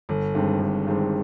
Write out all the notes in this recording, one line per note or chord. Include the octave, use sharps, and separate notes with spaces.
G1
G2 D#3 G#3 C4
G1
G2 D#3 G#3 C4